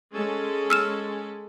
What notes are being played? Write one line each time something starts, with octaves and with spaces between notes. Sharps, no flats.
G#3 C#4 A4
E6 F6 E7